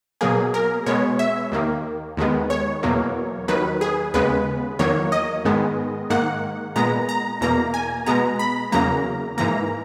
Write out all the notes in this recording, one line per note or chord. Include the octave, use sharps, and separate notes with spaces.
B2 F#3 A#3 G#4
A#4
B2 G#3 B3 C#5
E5
D#2 D#3 A#3
D#2 D#3 G#3 B3
C#5
E2 B2 F#3 A#3
D#2 D#3 F#3 B4
G#4
D#2 C#3 G#3 B3 B4
E2 D#3 F#3 A#3 C#5
D#5
G#2 D#3 G#3 B3
G#2 D#3 A#3 F#5
A#2 G#3 B3 A#5
A#5
E2 B2 A#3 A#5
G#5
B2 G#3 B3 A#5
B5
E2 C#3 F#3 A#3 A#5
G#2 E3 A#3 A#5